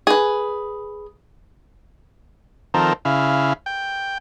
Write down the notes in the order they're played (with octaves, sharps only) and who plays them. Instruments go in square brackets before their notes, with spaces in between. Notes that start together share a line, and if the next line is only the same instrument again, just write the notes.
[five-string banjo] G#4 B4
[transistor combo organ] D#3 F3 C4 A4 A#4
C#3 E4 F5
G5